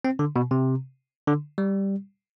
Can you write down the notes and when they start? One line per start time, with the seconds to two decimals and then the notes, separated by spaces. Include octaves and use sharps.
0.04 C4
0.19 D3
0.36 B2
0.51 C3
1.27 D3
1.58 G3